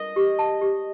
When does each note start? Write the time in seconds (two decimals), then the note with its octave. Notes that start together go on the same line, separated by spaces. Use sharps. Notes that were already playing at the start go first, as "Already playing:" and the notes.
Already playing: D#5
0.16 G4
0.39 A5
0.61 G4